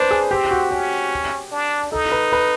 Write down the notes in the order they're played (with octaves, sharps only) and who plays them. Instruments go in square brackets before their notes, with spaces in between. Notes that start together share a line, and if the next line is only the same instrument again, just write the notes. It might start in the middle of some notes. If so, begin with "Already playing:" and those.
Already playing: [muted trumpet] D4 [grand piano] B4 C5
[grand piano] G#4
[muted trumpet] C4 [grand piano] G4
[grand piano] F#4
[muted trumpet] C#4 [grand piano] G4
[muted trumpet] D4
[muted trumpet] D#4 [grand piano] A4
[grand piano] B4
B4